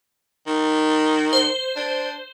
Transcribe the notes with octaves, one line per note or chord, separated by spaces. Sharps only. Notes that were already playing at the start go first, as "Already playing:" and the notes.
D#3
C5
D4